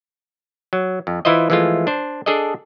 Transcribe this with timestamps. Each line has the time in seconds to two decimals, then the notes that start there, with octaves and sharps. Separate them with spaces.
0.73 F#3
1.07 F2
1.25 E3 E4 F4 C5 D#5
1.50 E3 F3 G#3 A3 F4
1.87 D4 C5
2.26 D4 G#4 A4 D5 D#5